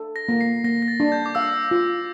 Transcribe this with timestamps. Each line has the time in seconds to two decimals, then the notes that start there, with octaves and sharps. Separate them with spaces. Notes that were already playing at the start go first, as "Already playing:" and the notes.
Already playing: A4
0.16 A#6
0.29 A#3
0.41 C7
0.64 A#3 A#6
0.82 A#6
0.88 A6
1.00 D4
1.12 G6
1.26 D6
1.35 F5 E6
1.71 F4